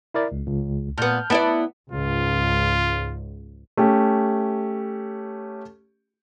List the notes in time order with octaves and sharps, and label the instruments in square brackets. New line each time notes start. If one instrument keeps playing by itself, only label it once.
[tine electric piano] E4 A#4 D5
C#2
C#2
[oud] A#2 B3 [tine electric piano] A5 F6 G6
[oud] B3 E4 D5 [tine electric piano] A5 B5
[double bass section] C#2 G#2 [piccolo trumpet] F4
[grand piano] A3 C#4 G4